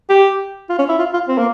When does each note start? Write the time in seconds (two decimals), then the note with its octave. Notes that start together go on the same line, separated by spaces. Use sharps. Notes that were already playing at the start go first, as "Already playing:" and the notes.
0.09 G4
0.69 F4
0.79 C#4
0.89 E4
0.99 F4
1.14 F4
1.28 C4
1.38 A#3